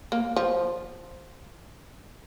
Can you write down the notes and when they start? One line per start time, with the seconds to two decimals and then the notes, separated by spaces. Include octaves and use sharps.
0.12 A#3
0.36 F3